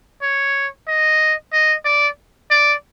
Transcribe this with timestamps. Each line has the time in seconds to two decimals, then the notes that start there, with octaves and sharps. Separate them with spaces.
0.22 C#5
0.88 D#5
1.53 D#5
1.85 D5
2.51 D5